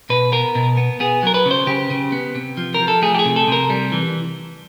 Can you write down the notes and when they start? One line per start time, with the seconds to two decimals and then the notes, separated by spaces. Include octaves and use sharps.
0.09 B2 B4
0.32 B3 A#4
0.55 B2
0.77 B3
1.00 B3 G#4
1.23 F#3 A#4
1.34 B4
1.46 C#3
1.51 C5
1.67 C#3 G4
1.90 C#3
2.12 B3
2.35 C3
2.57 F3
2.74 A#4
2.80 F3
2.88 A4
3.02 A3 G#4
3.15 G4
3.19 G#4
3.25 C3
3.36 A4
3.48 C3 A#4
3.70 G3
3.92 E3